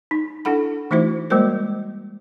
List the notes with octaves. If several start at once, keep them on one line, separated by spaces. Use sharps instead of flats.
D#4
D4 E4 A4 F#5 B5
E3 A3 D#4 E4 F#4 C5
G3 G#3 A#3 F#4 A#4 C5